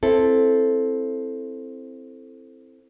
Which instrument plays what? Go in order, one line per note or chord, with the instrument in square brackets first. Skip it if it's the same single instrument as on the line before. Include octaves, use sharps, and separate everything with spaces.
[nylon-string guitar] C4 E4 A4